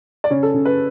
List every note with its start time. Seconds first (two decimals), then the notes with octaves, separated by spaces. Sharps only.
0.24 D5
0.30 C#3 C#5
0.43 A4
0.54 C#3
0.65 B4